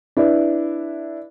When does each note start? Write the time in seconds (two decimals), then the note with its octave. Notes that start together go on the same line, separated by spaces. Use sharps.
0.17 D4 E4 B4